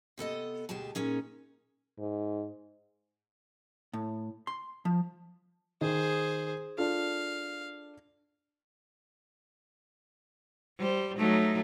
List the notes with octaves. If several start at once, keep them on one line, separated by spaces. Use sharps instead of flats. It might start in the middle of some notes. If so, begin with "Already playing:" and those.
C3 B3 A4 D#5
D2 B2 G#3 G4 A5
A#2 C#4 D#4 G#4
G#2
A2
C6
F3
D#3 G#4 C5
D4 F4 A4 F5
G3 C5
F#3 A3 D#4